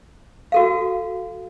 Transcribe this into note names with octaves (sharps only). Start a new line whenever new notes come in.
F#4 A4 F5